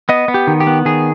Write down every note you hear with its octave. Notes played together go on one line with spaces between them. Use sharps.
B3 D#5
B3
G4
D#3
G4
B3
D#3 G#4